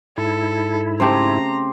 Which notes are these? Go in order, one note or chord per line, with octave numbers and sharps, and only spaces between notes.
G#2 E4 A4
C#3 A3 C4 G4 C5 A#5